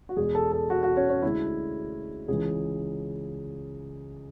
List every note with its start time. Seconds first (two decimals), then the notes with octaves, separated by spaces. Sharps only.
0.09 F#4
0.16 E2 B2 G#3 G#4
0.35 A4
0.52 A4
0.70 F#4
0.83 F#4
0.97 C#4
1.10 C#4
1.22 D2 D3 G#3 E4
2.28 C#2 C#3 E3 G#4